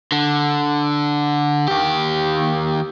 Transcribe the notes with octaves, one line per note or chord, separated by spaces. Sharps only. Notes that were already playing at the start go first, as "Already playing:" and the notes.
D3
D#2 G4